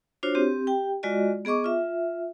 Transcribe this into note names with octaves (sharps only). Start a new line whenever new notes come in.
D4 F4 F#4 C5 C#5
C4 G4
G4 G5
G#3 F4 F#4 D5 D#5
B3 G#4 D#5 C#6 D6
F4 E5